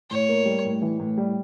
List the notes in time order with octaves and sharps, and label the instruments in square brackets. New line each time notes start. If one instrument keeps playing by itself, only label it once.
[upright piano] A2 [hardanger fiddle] C#5
[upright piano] A#3
G3
A2
E3
A2
G3